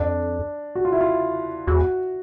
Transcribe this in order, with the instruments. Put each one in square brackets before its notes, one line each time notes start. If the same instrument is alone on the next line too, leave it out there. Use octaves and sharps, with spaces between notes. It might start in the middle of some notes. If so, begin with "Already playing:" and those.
Already playing: [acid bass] F2 [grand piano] D4
[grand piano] F#4
F4
E4
F4
[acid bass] E2 [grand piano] F#4